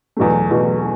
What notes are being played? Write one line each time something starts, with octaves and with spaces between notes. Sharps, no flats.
E2 B2 F#3 A3
E2 B2 F#3 A3